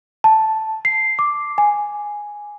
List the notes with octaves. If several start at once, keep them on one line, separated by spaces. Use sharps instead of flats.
A5
C7
D6
G#5